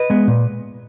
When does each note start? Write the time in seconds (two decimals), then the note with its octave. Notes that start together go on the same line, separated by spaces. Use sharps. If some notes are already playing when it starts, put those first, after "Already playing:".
Already playing: B4 D#5
0.10 G#3 B3
0.28 A#2